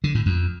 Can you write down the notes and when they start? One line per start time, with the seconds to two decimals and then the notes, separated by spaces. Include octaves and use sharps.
0.04 D3
0.15 A2
0.26 F2